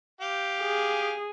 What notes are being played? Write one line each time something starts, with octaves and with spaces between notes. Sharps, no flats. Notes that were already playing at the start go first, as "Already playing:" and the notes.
G4 F5
G#4